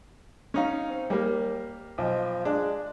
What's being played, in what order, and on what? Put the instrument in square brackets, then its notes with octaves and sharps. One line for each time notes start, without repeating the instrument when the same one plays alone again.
[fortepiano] C#4 D#4 F5
[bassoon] C4
[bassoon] D#2 [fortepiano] G3 A#3
[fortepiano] B1 [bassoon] F3
[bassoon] G#3 [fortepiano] D4